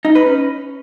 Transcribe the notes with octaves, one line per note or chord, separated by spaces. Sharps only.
D#4
B4
C#4